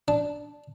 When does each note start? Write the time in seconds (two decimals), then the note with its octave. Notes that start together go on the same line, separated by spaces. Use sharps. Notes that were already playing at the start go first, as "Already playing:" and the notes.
0.08 D4